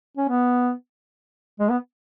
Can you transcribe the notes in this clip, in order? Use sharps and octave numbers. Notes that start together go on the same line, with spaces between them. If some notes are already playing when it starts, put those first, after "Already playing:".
C#4
B3
G#3
B3